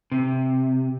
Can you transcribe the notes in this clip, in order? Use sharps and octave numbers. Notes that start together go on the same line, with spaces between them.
C3